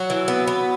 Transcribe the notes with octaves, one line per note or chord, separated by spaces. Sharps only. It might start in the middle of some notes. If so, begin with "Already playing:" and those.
Already playing: F#3 F#4
E3
B3
B3